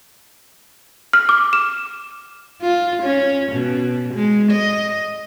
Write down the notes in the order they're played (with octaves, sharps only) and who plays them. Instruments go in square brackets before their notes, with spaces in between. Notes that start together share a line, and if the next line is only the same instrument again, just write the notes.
[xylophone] F6
D6
E7
[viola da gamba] F4
C#4
B2
G#3
D#5